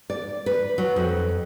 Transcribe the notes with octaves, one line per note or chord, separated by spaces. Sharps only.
D5
B4
F#3
F2